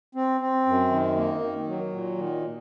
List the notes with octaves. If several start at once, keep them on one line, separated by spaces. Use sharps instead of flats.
C4
C4
F#2
D#3
A#3
D#3
F#3
A#2
D#3